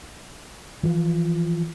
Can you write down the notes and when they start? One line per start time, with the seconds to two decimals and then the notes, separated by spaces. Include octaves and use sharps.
0.83 E3 F3